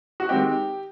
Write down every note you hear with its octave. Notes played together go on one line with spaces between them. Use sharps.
F#4
D#3 G#3 C4 D#4 G4